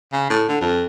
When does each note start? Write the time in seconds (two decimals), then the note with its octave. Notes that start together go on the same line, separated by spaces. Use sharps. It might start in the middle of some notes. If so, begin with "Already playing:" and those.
0.13 C#3
0.30 A2
0.49 D3
0.61 F2